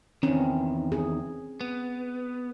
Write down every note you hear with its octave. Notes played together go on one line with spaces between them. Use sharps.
E2 D#3 C4 C#4
G#4
B3